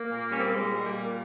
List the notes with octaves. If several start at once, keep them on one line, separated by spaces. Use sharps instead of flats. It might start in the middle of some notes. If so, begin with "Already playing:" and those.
Already playing: A#3
A#2
G3 C#4
C4
A#3
A#2 G#3
G3
A#3
A#2